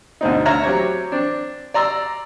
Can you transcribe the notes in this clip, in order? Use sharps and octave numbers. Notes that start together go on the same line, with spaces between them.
D2 B2 C4 D#4
D2 C#5 E5 A#5 F6
F#3 C4 G4 C#5
C4 D4
D5 A#5 C6 E6